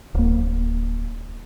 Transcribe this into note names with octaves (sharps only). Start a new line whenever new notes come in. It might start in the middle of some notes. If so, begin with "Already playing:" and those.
D1 A#3